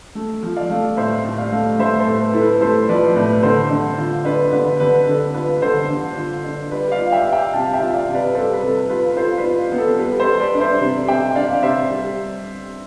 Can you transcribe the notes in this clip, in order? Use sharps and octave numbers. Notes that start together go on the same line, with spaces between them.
A3
F3
D5 F5
A3
A2 C5 E5
A2
D5 F5
A3
A3 C5 E5
A4 C5
A2
B4
E4 A4
B4
A3 A4 C5
F3 B4 D5
A2 B4
D3 A4 C5
D3
F4
D4 B4
D3 B4
D3 B4
D4 A4
F4 B4
D3 A4 C5
D3
F4
D4
G3 B4 D5
D5 F5
F4
E5 G5
G3
E5 G5
C3 F5 A5
E5 G5
F4
D5 F5
C3
B4 D5
G3 A4 C5
B4
C3 A4
F4 B4
F4 A4 C5
B4 D5
F4
B4
B3
A4
G3 B4
A4 C5
G3
B4 D5
D4
C5 E5
C3
C3 E5 G5
D4 D5 F5
C3 C5 E5
G3